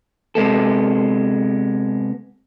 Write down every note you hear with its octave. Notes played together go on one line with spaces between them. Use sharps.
C3 G#3 B3 A4